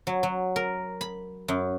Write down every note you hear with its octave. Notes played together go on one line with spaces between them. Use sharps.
F#3
F#3
A#4
B5
F#2